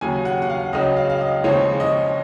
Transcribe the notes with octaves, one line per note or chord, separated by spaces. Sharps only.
D#2 C#3 F#3 G#5
F#5
F#5
F5
C#2 C#3 F#3 D#5
F5
F5
D#5
D#2 C#3 F3 G#3 C#5
D#5